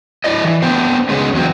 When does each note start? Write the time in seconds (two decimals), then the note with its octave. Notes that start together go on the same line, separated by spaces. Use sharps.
0.24 E4 D5 D#5
0.44 E3
0.62 B3 C4 D4 C5
1.09 C#3 G#3 B3 C#4 D#4
1.33 E2 F#3 C4